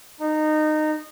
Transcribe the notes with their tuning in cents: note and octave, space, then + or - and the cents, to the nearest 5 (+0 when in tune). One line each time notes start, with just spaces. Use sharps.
D#4 -20